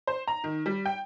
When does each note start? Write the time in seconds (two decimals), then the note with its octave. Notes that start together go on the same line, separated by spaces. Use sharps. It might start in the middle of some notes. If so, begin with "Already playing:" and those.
0.07 C5
0.27 A#5
0.44 D#3
0.66 G3
0.86 G5